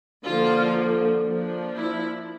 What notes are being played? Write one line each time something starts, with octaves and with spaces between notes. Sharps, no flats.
D3 F3 A#3 F4
F3 A#3 D4
E4